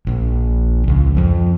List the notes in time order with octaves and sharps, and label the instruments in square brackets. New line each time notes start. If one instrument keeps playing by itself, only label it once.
[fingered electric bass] A#1
C#2
F2